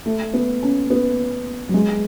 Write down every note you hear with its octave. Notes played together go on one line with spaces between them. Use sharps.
A3
B3
C#4
B3
F#3
G#3